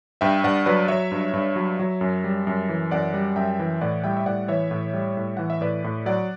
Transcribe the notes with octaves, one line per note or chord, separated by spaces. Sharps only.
G2 E5 G5
G2 D5 F#5
F#3 B4 D5
F#3 C#5 E5
G2
G2
F#3
F#3
F#2
G3
F#2
E3
F#2 D5 F#5
G3
F#2 E5 G5
E3
A2 D5 F#5
G3 E5 G5
E5
A2 D5 F#5
E3 C#5 E5
A2
G3
A2
E3 F#5
E5
A2 B4 D5
A2
F#3 D5 F#5